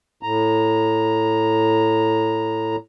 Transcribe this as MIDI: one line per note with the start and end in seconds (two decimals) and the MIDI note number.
0.23 2.76 45
0.23 2.76 82